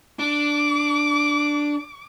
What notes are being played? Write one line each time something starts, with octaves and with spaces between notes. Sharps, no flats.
D4 D6